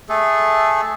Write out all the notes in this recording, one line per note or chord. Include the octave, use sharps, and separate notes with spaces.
A3 G#4 A4